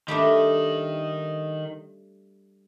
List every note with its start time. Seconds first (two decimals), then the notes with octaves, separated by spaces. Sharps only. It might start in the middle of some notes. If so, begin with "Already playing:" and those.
0.08 D#3 G3 A3 D4